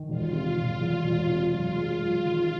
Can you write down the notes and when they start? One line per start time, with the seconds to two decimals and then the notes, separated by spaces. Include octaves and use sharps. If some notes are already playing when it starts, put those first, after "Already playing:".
Already playing: D#3
0.09 E1 F4
0.33 C3
0.57 E1
0.80 E2
1.05 E1
1.29 C3
1.52 F#2 F4
1.77 G#3
2.01 F#2
2.24 D#3